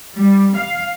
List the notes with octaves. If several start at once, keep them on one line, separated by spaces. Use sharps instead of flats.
G3
F5